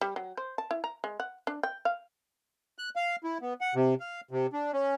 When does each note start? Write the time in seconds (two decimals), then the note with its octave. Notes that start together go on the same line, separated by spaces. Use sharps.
0.01 G3
0.16 F#3
0.37 C5
0.58 A5
0.71 E4
0.84 A#5
1.04 G#3
1.20 F#5
1.47 D4
1.63 G5
1.85 F5
2.78 F#6
2.96 F5
3.24 E4
3.42 B3
3.61 F#5
3.75 C3
4.00 F5
4.31 C3
4.53 D4
4.73 C#4